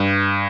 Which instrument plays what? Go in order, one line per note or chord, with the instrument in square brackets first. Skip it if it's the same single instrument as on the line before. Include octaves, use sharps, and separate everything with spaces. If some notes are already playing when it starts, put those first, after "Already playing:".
Already playing: [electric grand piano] G2